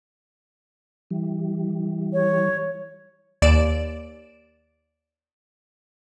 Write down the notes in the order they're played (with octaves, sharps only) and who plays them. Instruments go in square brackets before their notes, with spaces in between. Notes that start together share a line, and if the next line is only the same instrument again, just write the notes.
[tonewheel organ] E3 G3
[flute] C#5
[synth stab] D#2 D5 D7 E7